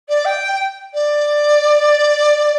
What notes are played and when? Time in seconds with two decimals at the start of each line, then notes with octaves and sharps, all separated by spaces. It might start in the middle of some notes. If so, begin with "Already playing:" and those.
0.09 D5
0.25 G5
0.93 D5